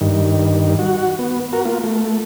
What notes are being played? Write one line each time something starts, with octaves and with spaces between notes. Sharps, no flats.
G2 D#3
F#4
B3
F#4 A#4
A#3 F4
A3